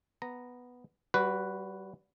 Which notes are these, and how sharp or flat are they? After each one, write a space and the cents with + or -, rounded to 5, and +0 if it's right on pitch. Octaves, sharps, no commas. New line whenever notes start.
B3 +0 A#5 +0
G3 -30 F#4 +0 B4 +0